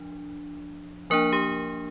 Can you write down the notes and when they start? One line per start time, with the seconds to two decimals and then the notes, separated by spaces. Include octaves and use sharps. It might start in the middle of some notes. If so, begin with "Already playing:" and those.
Already playing: F3 D4
1.10 F3 A#3 D4 A#4
1.33 G4